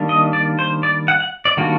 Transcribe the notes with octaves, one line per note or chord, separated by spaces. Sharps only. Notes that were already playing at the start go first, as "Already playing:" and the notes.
Already playing: D#3 G3 A#3 D4
D#5
D5
C5
D5
F#5
F#5
D5
D#3 G3 A#3 D4 F#4